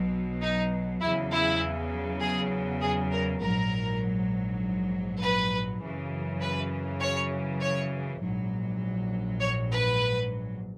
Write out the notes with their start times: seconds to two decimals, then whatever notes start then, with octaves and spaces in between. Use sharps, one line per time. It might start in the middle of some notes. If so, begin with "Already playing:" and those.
Already playing: B1 B2 F#3
0.42 D#4
1.00 E2 C#3 F#3 E4
1.32 E4
2.20 G#4
2.81 G#4
3.11 A#4
3.41 A#1 G#2 F#3 A#4
5.21 B4
5.81 F#2 C#3 E3
6.40 B4
7.00 C#5
7.61 C#5
8.20 A#1 G#2 F#3
9.40 C#5
9.71 B4